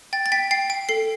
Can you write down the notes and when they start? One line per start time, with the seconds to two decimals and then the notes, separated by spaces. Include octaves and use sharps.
0.13 G5 A6
0.26 A6
0.32 G5 B6
0.51 G5 C7
0.70 G5 D7
0.89 A4 C7